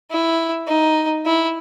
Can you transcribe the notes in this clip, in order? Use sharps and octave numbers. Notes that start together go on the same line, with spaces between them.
E4
D#4
E4